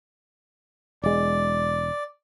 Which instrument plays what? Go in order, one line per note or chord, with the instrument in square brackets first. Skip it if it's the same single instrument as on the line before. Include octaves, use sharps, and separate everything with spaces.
[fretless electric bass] E1 G#3 [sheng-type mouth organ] D5